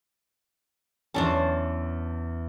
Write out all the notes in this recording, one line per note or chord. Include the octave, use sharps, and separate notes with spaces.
E2 C#4 D4 C5 A5